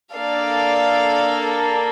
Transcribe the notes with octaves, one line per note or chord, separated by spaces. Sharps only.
A#3 D4 A4 D5 F5